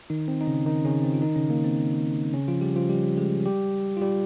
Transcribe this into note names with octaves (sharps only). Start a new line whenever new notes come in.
D#3 D#4
C4
D#4
C#3 C#4
D#3 D#4
C#3 C#4
C4
F4
D#3 D#4
C#3 C#4
A#3
C4
C#3 C#4
F3 F4
G3 G4
F3 F4
G3 G4
G#3 G#4
G3 G4
F4
G3 G4